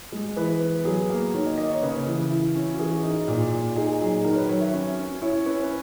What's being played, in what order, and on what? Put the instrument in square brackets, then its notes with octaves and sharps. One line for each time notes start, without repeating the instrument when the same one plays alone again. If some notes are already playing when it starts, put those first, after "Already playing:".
[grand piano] G#3
E3 B4
B3
F#3 G#4
A#3 A#4
D#3 C#5
D#5
A#3 D#5
C#5
C#3 B4
E3
E4
C#4
F#4
E3 G#4
D#4
A#2
A#2
D#4 G#4
F#3
D#3 A#4
C#5
B4
F#3 C#5
E5
C#4
C#4
E4 C#5
C#4 B4
B4